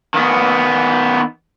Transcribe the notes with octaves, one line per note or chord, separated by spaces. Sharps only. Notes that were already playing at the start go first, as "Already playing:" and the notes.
D#3 B3